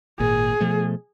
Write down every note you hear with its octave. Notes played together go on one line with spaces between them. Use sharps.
G#1 A#2 G#4
B2 F3 A3